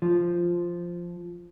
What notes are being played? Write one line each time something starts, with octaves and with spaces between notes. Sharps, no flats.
F3